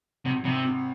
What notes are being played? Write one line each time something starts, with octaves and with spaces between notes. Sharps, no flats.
G#1 C3
G#1 C3
C3